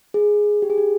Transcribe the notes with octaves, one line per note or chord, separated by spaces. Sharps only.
G#4
G4
G#4
G4